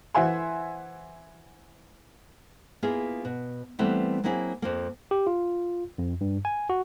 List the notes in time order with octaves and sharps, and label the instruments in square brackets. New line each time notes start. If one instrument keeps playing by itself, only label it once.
[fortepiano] E3 C5 E5 F#5 G#5 C6
[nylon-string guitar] A#3 B3 E4 F4 G#4
B2
E3 G3 A3 B3 C4 E4
F#3 A#3 C4 E4 F#4 G#4
F2 F3 A#3
[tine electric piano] G4
F4
F2
G2
G#5
F#4